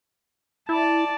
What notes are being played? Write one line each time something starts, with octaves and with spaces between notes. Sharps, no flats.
E4 D5 A5